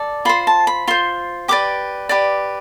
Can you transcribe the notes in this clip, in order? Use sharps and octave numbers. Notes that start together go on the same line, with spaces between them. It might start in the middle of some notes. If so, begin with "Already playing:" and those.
Already playing: A4 D5
F4 C5 B5
A5
B5
F4 C5 C6
G4 B4 D5 D6
G4 B4 D5